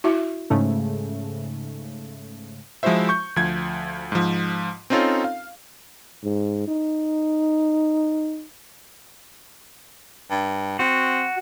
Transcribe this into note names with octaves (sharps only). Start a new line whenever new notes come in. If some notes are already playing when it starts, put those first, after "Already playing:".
E4 F#4 E5
G#2 C#3 A3
F3 G#3 E4 F#4 C5 E5
C#6 G6
D2 F3 G#6
G#2 F3
C4 C#4 D#4 F4 A4 C#5
F5
G#2
D#4
G2
C4 F#4